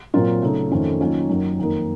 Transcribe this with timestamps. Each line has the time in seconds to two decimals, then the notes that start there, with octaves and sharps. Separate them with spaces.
0.13 A#2 F#3 C4 F4 A#4
0.42 C#3 F#3 A3 D#4
0.71 F2 D#3 A3 C#4 F4
1.00 D#3 F#3 A#3 C#4 F4
1.29 F#2 D#3 F#3
1.58 F2 D#3 A#3 D#4 A#4